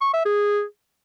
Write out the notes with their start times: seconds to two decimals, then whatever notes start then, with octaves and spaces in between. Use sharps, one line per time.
0.01 C#6
0.13 E5
0.25 G#4